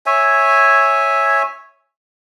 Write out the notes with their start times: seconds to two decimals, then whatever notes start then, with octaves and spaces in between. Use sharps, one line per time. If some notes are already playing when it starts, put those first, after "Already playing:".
0.06 C#5 E5 G#5